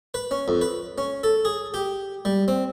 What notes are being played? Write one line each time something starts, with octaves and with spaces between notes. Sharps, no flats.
B4
C#4
F2
B4
C#4
A4
G#4
G4
G3
C4